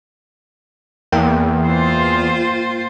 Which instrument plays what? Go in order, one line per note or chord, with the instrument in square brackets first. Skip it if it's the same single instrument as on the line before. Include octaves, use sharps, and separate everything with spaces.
[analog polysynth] E2 [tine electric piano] A#3 A#4 G5
[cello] F4 C5